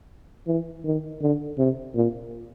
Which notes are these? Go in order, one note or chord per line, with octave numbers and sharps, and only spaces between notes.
E3
D#3
D3
C3
A#2